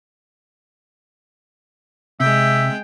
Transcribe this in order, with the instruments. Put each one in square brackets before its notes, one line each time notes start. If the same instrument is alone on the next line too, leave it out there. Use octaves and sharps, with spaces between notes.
[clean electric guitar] C3 [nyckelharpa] G#3 G5 [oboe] E5